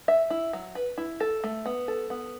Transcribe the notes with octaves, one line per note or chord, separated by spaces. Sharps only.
E5
E4
F#3
B4
E4
A4
A3
B3
A4
B3